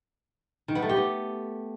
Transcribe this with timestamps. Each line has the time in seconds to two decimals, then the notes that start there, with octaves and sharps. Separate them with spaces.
0.68 D#3
0.75 B3
0.82 A3
0.89 G4
0.96 B3